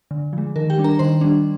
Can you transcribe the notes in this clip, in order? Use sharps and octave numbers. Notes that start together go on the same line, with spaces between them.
D3
F3
G#3
D#3 A#4
G4 G5
G3 D4
A#4 A#5
D#3 C5 C6
G3 D4